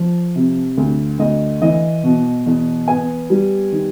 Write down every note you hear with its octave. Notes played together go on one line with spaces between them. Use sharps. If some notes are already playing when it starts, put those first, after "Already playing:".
Already playing: F3
C3
D2
D2 D#5
E3 D#5
B2
E2
B3 G#5
G3
D#3